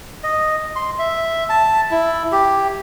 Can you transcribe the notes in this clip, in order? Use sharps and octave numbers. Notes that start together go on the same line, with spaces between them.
D#5
C6
E5
A5
E4
G4